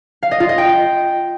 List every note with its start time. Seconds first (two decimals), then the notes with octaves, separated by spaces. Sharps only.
0.23 F5
0.31 D#5
0.40 F4
0.49 D#5
0.58 G5